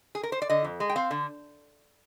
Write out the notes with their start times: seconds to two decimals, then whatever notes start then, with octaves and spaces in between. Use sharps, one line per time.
0.15 G#4
0.23 A#4
0.32 C5
0.42 D5
0.49 D3 D#5
0.64 F2
0.80 G#3
0.89 G5
0.96 C4 F5
1.11 D3